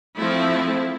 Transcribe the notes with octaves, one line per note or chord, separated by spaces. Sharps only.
F3 A3 C4 E4